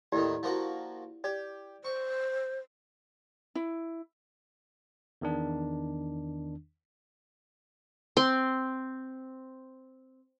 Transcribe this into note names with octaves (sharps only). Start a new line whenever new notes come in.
D#2 A2 D#3 E4 G4 D5
F3 A#3 F#4
G4 D5
C5 C#6
E4
E2 D#3 D4
C4 C6